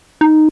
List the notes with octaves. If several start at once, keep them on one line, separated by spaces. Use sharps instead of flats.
D#4